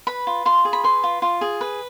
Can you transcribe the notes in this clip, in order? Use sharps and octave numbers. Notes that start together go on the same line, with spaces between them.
B4 B5
F4
F4 C6
G#4
B5
B4 C6
F4
F4
G#4
B4